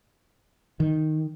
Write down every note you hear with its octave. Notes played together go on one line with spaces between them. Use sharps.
D#3